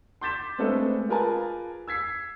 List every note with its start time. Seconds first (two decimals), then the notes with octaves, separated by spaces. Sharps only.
0.21 C6 D6 G6 A6 B6 E7
0.58 G#3 A3 B3 C4 D4 A4
1.09 F4 G#4 A#4 B4 G#5 A5
1.88 E6 G#6 B6 C7